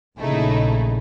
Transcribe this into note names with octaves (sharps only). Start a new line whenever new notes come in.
A#1 C#3 A3 D#4 E4